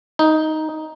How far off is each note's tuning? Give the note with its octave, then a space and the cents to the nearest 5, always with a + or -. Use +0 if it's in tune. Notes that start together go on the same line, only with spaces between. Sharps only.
D#4 +5